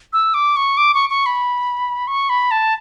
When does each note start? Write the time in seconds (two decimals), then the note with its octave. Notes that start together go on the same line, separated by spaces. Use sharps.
0.13 E6
0.34 D6
0.56 C#6
0.77 D6
0.94 C#6
1.10 C#6
1.26 B5
2.07 C#6
2.29 B5
2.51 A5